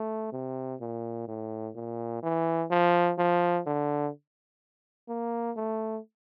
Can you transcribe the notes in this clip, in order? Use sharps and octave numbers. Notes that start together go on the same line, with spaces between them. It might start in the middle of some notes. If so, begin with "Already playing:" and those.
Already playing: A3
C3
A#2
A2
A#2
E3
F3
F3
D3
A#3
A3